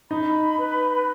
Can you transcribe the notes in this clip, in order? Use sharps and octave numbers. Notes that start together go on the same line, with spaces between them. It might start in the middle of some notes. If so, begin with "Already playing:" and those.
D#4 B5
B4